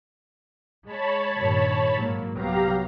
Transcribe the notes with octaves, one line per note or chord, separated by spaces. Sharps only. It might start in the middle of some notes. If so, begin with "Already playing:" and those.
G#3 C#5 A5 B5
G2 A#2 D#3
G#2 F#3 A#3
C2 F#3 B3 G4 F5 A#5